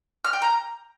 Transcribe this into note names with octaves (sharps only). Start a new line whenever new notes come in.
F6
G5
A#5